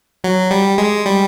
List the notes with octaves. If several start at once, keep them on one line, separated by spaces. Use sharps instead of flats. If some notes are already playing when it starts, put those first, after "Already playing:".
F#3
G3
G#3
G3